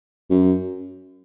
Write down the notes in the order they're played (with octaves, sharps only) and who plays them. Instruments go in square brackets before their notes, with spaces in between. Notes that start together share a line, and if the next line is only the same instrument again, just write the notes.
[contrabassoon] F#2